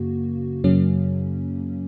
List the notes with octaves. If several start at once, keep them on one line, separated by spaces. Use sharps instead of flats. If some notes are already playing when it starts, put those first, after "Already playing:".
Already playing: F#2 C#3 A#3 F#4
F#2 C#3 F#3 A#3 C#4